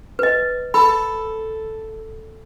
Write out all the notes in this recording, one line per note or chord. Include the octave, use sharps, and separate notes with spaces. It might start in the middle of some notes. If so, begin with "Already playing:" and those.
B4 D#5
A4 B5